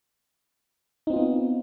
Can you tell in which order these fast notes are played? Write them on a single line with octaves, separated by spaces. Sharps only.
D#4 C4 F4 B3